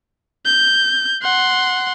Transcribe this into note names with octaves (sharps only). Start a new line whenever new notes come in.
G6
F#5 C6